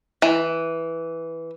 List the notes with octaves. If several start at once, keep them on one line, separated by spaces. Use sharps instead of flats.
E3